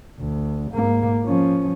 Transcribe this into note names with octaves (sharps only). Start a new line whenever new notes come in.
D2
G#2 A#3
F3 C#4